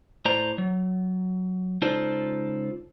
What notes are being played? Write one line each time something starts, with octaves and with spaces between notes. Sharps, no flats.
A2 C5 D5 A#5
F#3
C#2 D#4 F4 A4 C5 D5